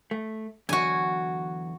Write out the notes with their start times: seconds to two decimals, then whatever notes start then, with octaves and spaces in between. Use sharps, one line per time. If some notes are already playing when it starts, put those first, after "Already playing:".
0.11 A3
0.69 E2 D3 F#3 F#4 G#5